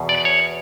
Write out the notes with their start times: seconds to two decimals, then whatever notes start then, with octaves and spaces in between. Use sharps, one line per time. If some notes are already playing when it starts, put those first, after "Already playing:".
Already playing: E2 B2
0.09 D5
0.25 C#5